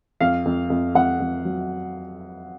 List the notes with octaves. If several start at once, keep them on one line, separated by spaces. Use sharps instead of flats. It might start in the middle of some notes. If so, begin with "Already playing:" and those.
F2 F5
F2
F2
F2 F#5
F2
F#3